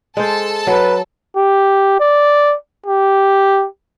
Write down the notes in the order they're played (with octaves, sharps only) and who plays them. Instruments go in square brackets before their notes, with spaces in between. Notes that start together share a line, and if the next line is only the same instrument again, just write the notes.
[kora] G#3 C5 [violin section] A4 A5
[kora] F#3 [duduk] B4
[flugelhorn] G4
D5
G4